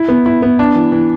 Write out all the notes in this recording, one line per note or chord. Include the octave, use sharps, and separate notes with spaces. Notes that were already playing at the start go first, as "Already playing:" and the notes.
Already playing: E4
B3
E4
B3
D4
E3
E3